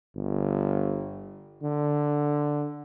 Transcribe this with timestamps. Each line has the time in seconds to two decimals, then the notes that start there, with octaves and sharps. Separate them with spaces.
0.16 G1
1.63 D3